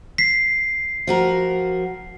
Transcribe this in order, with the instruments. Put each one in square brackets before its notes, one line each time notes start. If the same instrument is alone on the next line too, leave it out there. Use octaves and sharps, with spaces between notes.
[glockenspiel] B6 C7
[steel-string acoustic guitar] F3 F#4 A#4